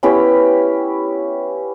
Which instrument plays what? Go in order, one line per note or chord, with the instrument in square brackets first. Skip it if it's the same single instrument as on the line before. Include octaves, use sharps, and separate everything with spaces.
[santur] B3 C#4 E4 G4